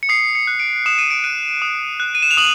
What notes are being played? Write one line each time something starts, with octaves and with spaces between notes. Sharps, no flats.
C#7
D#6 C7
C#7
F#6
D7
D#6 E7
D#7
D7
F#6 D#7
D#6
F#6
D#7
E7
F7
D#6 F#7